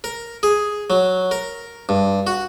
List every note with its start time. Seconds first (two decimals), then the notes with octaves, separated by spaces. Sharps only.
0.04 A#4
0.43 G#4
0.90 F#3
1.31 A#4
1.89 G2
2.27 F#4